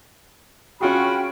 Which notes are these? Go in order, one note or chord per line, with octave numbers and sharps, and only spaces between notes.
C#4 F4 F#4 G#4 G5 B5